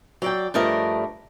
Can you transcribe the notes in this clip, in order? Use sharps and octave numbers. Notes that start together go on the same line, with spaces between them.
F#3 D5 G5
G2 F3 A3 D4 A#4 D#5